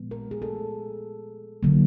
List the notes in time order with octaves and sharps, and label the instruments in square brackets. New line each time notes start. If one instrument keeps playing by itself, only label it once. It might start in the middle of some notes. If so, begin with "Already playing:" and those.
Already playing: [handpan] A#2 F3 G#3 B3
A#4
G#4
A4
D3 F#3 A#3